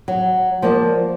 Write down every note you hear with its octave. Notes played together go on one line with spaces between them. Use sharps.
F#3
F3 A#3 D5 A5